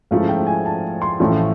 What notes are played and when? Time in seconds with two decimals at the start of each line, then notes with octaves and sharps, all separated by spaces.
0.11 G#2 F3 A3 C#4 E4 F5
0.29 G5
0.47 G#5
0.66 A5
1.02 C6
1.20 A1 A2 F3 A3 C#4